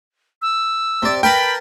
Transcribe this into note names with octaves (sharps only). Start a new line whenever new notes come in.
E6
C3 D5
A#4 B4 G5 A5 B5